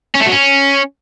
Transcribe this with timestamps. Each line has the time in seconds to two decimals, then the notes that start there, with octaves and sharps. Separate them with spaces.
0.15 C#4
0.21 A3
0.26 F#3
0.32 C#4